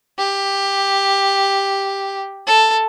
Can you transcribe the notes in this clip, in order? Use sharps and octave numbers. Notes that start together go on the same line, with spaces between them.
G4
A4